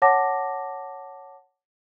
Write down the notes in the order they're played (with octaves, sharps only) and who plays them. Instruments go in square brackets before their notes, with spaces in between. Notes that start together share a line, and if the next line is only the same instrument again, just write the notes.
[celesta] C#5 F#5 A5 D6 A#6